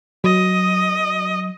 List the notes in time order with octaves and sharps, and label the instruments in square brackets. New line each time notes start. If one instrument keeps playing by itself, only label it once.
[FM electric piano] F#3 [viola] D#5